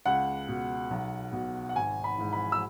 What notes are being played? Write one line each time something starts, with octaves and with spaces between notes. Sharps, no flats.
C#2 F#5
B2
B1
B2
F#5
G#1 G#5
B5
G#2 E3
B5
E6